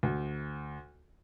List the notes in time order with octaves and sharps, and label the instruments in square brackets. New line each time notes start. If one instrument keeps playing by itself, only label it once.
[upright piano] D2